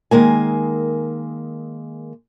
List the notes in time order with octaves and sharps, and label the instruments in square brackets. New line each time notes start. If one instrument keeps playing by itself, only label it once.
[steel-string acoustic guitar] D#3 G#3 A#3 G#5